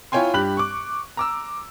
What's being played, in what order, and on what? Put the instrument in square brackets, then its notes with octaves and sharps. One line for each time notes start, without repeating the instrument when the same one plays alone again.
[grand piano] E4 F4 C#5 G5 G#5 C6
G2 G4 B5 F#6 F#7
C#6 D6
A#5 D6 E6